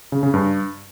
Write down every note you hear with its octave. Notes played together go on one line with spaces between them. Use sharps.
C#3
C#3
G2